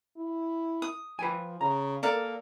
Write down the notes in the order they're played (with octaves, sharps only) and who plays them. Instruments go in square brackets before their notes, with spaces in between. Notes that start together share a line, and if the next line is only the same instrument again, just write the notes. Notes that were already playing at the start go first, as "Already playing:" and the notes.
[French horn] E4
[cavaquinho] D#6
[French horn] F3 [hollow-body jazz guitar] B4 G5 G#5
[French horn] C#3 [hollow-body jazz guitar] A#5
[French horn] A#3 [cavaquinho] A4 A#4 F5 [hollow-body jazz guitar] D5